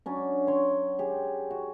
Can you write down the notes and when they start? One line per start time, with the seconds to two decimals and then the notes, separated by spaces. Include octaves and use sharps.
0.06 F#3 C#4 D4
0.47 C#5 C6
0.99 G4 G#4
1.51 F#4